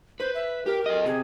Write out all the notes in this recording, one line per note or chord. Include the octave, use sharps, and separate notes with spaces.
B4 C5
E5
G4 A#4
A4 D#5
C3 G#4